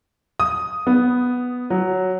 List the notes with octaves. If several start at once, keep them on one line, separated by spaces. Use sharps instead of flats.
D#6
B3
F#3